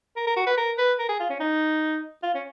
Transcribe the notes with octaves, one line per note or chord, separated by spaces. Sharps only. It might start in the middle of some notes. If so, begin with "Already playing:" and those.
A#4
A#4
F#4
B4
A#4
B4
A#4
G#4
F4
C#4
D#4
F4
C#4